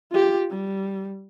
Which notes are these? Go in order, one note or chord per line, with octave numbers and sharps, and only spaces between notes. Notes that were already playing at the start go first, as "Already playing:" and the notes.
F4 G4
G3